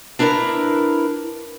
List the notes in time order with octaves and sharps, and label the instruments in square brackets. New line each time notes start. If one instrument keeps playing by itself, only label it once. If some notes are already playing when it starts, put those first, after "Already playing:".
[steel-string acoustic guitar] D4 E4 A#4 B4 A#5